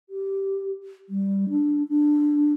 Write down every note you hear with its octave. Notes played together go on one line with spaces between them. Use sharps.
G4
G3
D4
D4